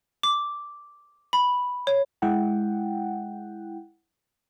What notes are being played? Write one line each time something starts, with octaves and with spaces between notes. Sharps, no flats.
D6
B5
C#5
G#3 E4 F#5 G5